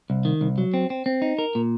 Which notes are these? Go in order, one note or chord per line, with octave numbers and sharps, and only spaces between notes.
C2
D#3
C2
F#3
C4
C4
C4
D#4
A#4
A#2